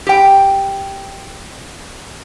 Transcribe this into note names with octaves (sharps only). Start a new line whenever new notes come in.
G4 G5